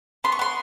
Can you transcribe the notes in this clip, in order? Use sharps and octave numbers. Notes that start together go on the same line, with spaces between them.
B3 C6
C#6
B3 C6